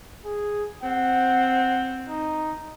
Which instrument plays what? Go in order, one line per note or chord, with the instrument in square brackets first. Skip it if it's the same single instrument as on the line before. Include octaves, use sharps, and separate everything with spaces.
[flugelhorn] G#4
[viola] C4 [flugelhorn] F#5
[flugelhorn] D#4